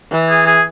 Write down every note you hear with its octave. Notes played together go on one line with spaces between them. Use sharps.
E3
G#4
G#4